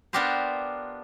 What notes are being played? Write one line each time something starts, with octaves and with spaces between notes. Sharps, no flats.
B3 D4 F4 G4 A#4 C5